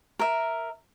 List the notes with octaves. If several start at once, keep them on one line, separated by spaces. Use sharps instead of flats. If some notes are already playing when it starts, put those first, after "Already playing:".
A#4 E5